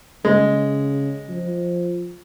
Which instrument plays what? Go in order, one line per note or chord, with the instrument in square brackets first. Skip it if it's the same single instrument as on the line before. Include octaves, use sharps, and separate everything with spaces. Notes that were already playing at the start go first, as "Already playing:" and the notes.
[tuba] C#3 [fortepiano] G#3
[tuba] F3